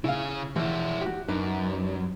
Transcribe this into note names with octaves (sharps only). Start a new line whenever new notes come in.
C#3 E4 G#4 F5
E3 F3 G#3 E4
F#4 G4
F#2 D4 D#4 B4